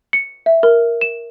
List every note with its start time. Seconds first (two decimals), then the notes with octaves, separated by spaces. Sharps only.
0.13 C#7
0.46 E5
0.63 A#4
1.01 E7